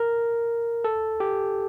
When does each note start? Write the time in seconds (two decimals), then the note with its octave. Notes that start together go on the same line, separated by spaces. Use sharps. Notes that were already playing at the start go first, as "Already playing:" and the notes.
Already playing: A#4
0.84 A4
1.20 G4